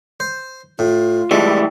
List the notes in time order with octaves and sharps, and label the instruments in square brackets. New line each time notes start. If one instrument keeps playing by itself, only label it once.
[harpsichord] C5
[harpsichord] A2 [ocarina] F4
[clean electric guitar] A2 E3 G3 [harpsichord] G#3